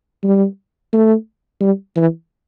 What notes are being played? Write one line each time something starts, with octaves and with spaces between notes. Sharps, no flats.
G3
A3
G3
E3